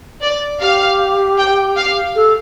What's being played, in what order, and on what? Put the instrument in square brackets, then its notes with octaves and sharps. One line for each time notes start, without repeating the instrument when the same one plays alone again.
[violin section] D5
[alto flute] G4 [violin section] F5
[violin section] G5
F5
[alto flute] A4